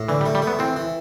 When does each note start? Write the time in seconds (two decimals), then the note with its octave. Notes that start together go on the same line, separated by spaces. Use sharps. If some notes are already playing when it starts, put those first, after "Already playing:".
Already playing: A2
0.08 D3 E3
0.21 G3
0.26 A3
0.35 G3
0.42 A3
0.47 B3
0.59 E3 C4
0.76 E3